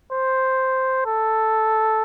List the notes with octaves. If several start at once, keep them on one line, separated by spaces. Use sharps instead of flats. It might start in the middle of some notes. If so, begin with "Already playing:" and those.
C5
A4